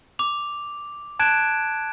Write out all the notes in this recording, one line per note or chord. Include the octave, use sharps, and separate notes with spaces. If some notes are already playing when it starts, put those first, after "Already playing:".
D6 F7
A5 F#6 G#6 D7 E7